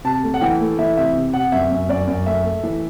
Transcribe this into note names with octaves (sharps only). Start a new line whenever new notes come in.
C3 A5
A3
F#5
E3 G5
A3
E3 E5
C3 E5
C3
C3 F#5
F#2 E5
F#2
F#2 D5
F#2
A3 E5
A3
E3